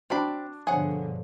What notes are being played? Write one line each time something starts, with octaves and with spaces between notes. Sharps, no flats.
C4 D4 F#4 D5 B5
G2 B2 D3 F3 G#4 C5 C#5 F#5